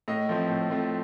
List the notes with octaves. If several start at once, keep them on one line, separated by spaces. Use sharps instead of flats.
A2 D#5
F3 A3 C4
A2
F3 A3 C4